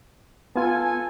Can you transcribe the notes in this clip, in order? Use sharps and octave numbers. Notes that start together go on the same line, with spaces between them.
B3 F4 A4 G#5